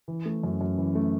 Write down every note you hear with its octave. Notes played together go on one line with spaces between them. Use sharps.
E3
A3
F#2
F#2
E3
A3